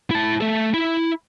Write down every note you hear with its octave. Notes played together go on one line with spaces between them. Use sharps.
E4 A5
A3 A4
E4